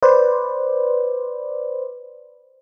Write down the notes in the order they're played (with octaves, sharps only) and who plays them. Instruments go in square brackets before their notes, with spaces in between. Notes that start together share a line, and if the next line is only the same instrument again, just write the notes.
[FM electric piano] B4 C5 D5